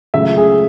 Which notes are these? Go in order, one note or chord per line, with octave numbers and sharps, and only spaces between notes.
C#2 C#3 F#3 A3 E5
G#4